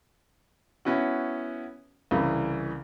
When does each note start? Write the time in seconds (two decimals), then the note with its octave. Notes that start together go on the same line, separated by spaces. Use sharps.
0.85 B3 C#4 E4 F#4
2.11 C2 C#3 E3